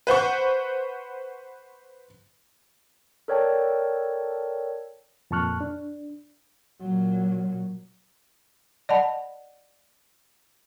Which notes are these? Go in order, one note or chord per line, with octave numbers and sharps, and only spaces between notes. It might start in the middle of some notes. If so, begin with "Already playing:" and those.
B4 C5 F#5 C#6
A4 A#4 C#5 D5 G5 A5
F2 A#2 A5 C#6 F6 F#6
D4
A#2 F#3
D5 D#5 F#5 A5 B5